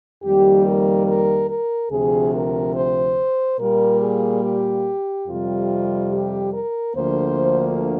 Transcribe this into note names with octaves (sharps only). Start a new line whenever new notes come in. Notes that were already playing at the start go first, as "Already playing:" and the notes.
F2 D#3 G3 A#3 G4
A#4
A#4
A#4
D2 C3 F3 G#4
A#4
C5
A#2 G3 A#3 A#4
G#4
G4
F2 C3 G3 F4
G4
A#4
D2 D3 F3 A#3 C5